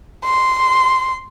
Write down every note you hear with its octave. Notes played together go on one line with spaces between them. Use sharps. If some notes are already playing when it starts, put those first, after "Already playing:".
C6